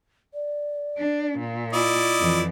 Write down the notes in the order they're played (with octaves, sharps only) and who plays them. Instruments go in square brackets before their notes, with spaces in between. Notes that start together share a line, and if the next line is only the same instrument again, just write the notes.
[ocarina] D5
[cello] D4
A#2
[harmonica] E4 D5 D#5 [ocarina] F4
[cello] F2 E3